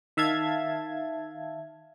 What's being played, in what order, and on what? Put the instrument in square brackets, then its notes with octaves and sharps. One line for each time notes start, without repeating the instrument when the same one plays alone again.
[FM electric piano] D#3 E5 F5 A5 G#6